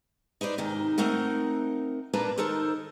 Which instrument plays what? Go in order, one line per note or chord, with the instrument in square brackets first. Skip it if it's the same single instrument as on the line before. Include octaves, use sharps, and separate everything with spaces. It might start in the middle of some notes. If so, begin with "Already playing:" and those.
[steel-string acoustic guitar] D#4 B4 C5 D5
G#2 C3 D#3 D#4
A3 C4 D#4 A#4 F#5
A#2 A#3 D4 B4 A5 A#5
D#3 D#4 A4 A#4 C5